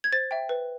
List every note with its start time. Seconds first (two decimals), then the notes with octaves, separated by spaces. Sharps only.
0.04 G#6
0.12 C5 A6
0.31 E5 G5
0.49 B4